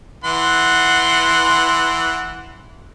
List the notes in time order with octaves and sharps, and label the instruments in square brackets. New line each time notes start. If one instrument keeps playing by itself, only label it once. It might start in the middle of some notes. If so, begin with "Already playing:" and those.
[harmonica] E3 F#5 C6